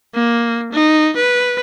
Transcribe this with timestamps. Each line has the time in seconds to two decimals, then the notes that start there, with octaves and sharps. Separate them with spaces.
0.14 A#3
0.72 D#4
1.16 B4